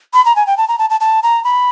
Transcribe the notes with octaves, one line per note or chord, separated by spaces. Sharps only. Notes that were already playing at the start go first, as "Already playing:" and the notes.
B5
A#5
G#5
G5
A5
A#5
A5
A5
A5
A#5
B5